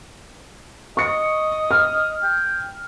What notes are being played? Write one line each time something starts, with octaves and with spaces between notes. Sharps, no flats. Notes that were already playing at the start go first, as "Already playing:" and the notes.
D#5 C#6 C#7
F6
G5